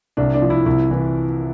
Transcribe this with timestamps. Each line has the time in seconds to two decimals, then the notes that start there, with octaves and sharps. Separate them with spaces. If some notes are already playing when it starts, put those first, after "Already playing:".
0.17 C2 D4
0.34 D4
0.42 F3
0.50 E4
0.66 C2 E4
0.91 E3